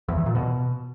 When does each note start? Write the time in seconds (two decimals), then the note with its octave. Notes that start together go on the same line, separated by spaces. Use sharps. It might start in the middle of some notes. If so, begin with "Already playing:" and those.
0.08 E2
0.17 E3
0.26 A#2
0.35 B2